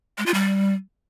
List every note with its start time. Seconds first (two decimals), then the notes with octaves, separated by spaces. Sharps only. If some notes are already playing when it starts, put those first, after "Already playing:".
0.18 G#3
0.26 F4
0.34 G3